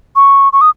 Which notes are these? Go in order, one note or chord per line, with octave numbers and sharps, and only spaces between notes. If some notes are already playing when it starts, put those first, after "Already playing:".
C#6
C#6
D#6